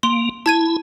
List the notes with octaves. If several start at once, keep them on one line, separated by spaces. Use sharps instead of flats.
A#3 C6
E4 A5 G#6 D#7